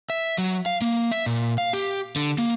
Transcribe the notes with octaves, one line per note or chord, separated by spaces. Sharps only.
E5
F#3
F5
A#3
E5
A#2
F5
G4
D3
A#3